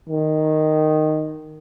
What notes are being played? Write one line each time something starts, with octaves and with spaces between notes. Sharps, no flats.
D#3